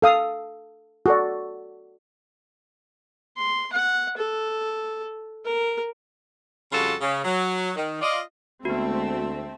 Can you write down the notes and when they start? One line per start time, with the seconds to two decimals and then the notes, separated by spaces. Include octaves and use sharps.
0.02 A4 F5 D#6
1.06 F#4 A4 D5
3.37 C6
3.73 F#5
4.17 A4
5.45 A#4
6.72 F2 C#3 G3 F4 F#4 A4
7.01 C#3
7.24 F#3
7.76 D#3
8.01 F4 D5 D#5
8.65 D2 G#3 A3 B3 C4 F#4 E5 A5